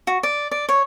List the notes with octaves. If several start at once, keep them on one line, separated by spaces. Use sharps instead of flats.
F#4
D5
D5
C#5